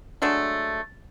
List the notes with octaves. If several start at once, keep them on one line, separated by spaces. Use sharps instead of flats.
F#3 G#3 A3 D4